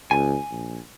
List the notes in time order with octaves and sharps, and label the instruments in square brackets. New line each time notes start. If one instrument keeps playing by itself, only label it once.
[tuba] C#2 [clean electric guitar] G#5
[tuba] A#1